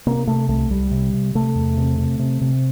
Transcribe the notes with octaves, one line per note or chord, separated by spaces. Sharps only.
C3 A#3
C3 A3
C2 A3
C2 G3
C3
C3
C3 A3
E2
C3
C3
C3
C3